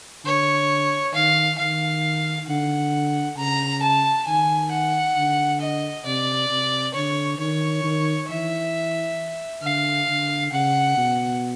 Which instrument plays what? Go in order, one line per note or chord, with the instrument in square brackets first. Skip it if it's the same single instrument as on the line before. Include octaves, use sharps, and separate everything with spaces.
[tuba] D3 [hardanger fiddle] C#5
[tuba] D#3 [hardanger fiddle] F5
[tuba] D#3 [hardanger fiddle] F5
[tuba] D3 [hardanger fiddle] F#5
[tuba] C#3 [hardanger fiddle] A#5
[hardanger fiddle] A5
[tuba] D#3 [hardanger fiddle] G#5
[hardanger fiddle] F#5
[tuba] D3
[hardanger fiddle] D#5
[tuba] C3 [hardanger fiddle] D5
[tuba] C3
[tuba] D3 [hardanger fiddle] C#5
[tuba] D#3 [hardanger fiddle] C#5
[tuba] D#3
[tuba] E3 [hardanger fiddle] E5
[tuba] D3 [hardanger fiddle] F5
[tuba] D3
[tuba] C#3 [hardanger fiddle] F#5
[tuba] B2